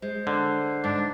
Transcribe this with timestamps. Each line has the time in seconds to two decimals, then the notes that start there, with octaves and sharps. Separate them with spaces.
0.02 G#3 C5
0.27 D3
0.84 G#2 D4